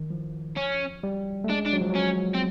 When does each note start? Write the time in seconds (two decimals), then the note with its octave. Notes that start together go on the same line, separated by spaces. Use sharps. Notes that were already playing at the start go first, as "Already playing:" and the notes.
Already playing: D#3
0.10 F3
0.56 C#4
1.03 G3
1.44 A3
1.50 G#3 D4
1.66 D4
1.73 F#3
1.81 F3
1.90 F#3
1.95 C#4
2.35 C4